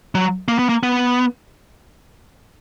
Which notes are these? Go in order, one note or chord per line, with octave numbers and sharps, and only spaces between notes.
F#3
A#3
B3
A#3
B3